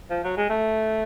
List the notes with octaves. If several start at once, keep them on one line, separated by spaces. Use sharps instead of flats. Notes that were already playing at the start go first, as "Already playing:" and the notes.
F3
F#3
G#3
A3